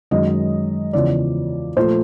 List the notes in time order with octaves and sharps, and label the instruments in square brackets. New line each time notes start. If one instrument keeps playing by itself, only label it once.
[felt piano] F#2 D#3 G#3 D#5
E2 C#3 F3 D5
A#2 F3 A3 C5